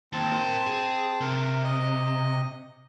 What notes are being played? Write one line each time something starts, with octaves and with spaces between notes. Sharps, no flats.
D#2 C4 A5
A#4 C6
G#4
C3 A#4
D#5